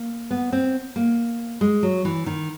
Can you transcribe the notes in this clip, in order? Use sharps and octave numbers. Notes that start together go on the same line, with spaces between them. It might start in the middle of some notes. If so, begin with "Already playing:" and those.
Already playing: A#3
B3
C4
A#3
G#3
F#3
E3
D#3